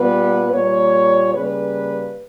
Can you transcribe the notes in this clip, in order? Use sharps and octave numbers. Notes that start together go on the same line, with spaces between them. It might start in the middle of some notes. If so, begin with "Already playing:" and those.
Already playing: A#2 G3 B3 B4
A#2 G3 A#3 C#5
C#3 G3 A#3 B4